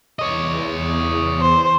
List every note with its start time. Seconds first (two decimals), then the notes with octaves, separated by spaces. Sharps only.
0.19 E2 C#5 D#5
1.41 C5